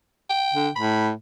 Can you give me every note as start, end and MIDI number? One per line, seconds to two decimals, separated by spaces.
0.30 0.71 79
0.54 0.69 50
0.76 1.12 45
0.76 1.07 83